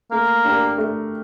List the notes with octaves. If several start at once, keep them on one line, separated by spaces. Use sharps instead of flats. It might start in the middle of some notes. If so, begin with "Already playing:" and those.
A3 A#3
D4 G4 A#4
A3